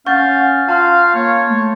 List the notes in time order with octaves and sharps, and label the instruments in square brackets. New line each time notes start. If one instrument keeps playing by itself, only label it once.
[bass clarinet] C#4 [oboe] F5 [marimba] F#5 [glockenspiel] C#6 G6 A6
[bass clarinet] F4 [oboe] F5 [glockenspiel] A5 C6
[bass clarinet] A#3 [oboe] C#5
[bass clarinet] A3